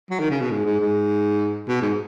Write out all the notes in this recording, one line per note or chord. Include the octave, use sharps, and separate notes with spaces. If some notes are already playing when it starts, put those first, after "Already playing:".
F#3
D#3
C#3
B2
G#2
G#2
G#2
B2
G#2